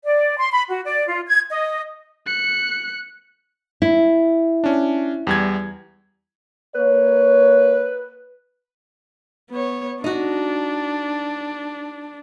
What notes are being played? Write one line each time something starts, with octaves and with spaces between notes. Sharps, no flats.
D5
C6
B5
F#4
D5
F4
G#6
D#5
F#6 C#7
E4
C#4 D4
E2 G3 G#6
A#3 B4 C#5
B3 C#5
D4 D#4 F#4